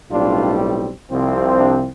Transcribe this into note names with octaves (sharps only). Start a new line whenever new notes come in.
B1 A2 G3 C4 D4 F4
C2 C3 F3 C4
D4 F4